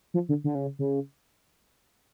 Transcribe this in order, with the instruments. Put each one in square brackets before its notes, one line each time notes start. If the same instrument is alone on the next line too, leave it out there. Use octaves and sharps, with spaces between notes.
[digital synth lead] F3
D3
D3
C#3
C#3